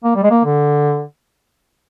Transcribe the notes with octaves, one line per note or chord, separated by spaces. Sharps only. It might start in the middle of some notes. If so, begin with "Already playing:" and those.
A#3
G3
G#3
A#3
D3